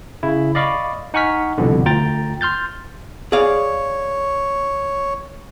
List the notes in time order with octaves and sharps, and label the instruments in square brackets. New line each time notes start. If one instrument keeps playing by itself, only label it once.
[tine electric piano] C#3 E4
D5 D#5 F5 B5 C#6 D6
D#4 F#5 G#5 C#6 F6 B6
C2 F2 B2 D3
D2 F4 G5 A#5 A6
C6 F6 G6 A6
[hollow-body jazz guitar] G#4 D5 F5 [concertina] C#5